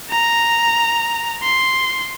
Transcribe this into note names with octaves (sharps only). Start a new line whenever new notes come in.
A#5
C6